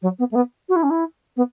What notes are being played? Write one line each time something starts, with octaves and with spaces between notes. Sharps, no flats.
F#3
B3
A3
B3
F#4
E4
C#4
E4
B3